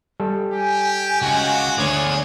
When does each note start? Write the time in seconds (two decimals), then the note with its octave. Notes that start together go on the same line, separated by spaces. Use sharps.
0.20 G3 A4
0.52 G4 G#5
1.22 C#2 F#4
1.78 D2 G#4 C#5 D5